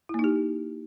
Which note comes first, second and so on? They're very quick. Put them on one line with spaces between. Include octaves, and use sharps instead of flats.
E4 A#3 D#4 G4